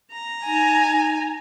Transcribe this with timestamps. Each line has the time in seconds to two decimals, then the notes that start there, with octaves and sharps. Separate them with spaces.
0.12 A#5
0.45 D#4 G#5